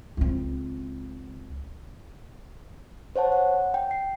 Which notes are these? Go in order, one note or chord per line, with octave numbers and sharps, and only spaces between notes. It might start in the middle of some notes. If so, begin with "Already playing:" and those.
C#2 C4
C5 C#5 F#5 A5
F#5
G5
C7